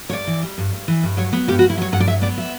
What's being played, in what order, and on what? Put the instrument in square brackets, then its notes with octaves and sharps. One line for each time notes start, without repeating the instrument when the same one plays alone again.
[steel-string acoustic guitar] C#5
G2 D5
E3
G3
G2
G2
E3
G2
F#3 C#5
B3
G2 G4
F#4
G2
E4
F#3 C#5
G2 F#5
D5
F#3 E5
B3 D5
E5